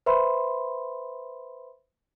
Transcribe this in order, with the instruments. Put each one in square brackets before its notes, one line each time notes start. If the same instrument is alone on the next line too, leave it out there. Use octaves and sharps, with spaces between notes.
[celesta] B4 C5 E5 B5 C6